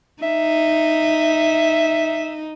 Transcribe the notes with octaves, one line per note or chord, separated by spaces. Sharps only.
D#4 E5